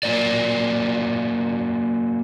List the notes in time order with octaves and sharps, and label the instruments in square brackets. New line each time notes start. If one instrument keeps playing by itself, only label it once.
[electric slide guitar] F#3 A#3 A#4 D5